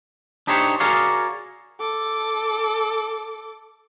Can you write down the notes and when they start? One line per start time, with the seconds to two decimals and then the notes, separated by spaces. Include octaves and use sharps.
0.47 D4 D#4 G4 C5 C#5
0.80 F#4 G#4 A#4 C#5 D5 F5
1.79 A4 D6